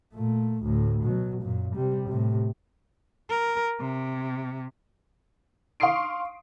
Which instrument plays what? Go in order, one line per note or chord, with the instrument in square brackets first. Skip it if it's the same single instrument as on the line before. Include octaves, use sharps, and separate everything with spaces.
[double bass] A#2 A3
D2 A2
B2 F#3
F#2 A#2
C3 G3
A2 C3
[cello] A#4
C3
[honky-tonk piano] F5 C6 C#6 D#6 C7 D7